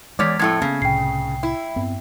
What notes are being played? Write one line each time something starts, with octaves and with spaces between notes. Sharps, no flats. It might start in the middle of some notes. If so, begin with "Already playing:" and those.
E2 G#3 C#5 D5 D6 F6 B6
F2 A2 A3 G#6
C#3 A#3 B3 C#4
C2 A2 C3 G5 C7
E4
G2 B3 C4